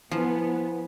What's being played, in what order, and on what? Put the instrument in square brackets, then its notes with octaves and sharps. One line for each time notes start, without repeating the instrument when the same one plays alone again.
[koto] F3 [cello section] B3 [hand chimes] E4 F4 G#5